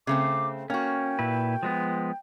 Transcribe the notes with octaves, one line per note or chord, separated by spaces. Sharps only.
C#3 A3 C4 D6
A#3 C#4 F#4 G5
A#2 E4 B4
F3 G#3 B3